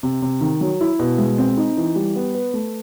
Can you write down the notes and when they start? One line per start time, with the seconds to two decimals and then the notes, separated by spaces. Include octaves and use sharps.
0.03 C3
0.22 C3
0.41 D#3
0.61 F#3
0.81 E4
0.99 B2
1.18 G#3
1.38 C4
1.57 D#4
1.77 E3
1.96 G3
2.16 B3
2.35 B4
2.54 A3